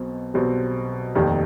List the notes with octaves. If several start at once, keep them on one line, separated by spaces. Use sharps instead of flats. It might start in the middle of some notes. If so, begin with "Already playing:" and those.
Already playing: B1 B2 C4
B1 B2 G3 C4
F1 D#2 D#3 G3